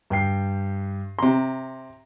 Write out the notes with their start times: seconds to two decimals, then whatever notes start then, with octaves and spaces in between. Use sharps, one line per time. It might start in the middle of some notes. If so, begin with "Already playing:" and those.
0.10 G2 G5 C7
1.19 C3 A#5 C6